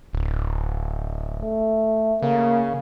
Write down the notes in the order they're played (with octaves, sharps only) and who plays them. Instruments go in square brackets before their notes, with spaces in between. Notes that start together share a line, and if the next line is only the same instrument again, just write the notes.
[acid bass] D1
[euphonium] A3
[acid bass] C#3 [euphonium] A#3